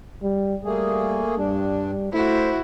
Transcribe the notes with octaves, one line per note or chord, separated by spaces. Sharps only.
G3
G3 A3 A#3 G#4
G2 G3 D4
A3 E4 F#4 C5